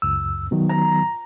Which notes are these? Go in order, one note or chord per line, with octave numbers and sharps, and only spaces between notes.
C#2 F#2 E6
D#3 F#3 B3
A#5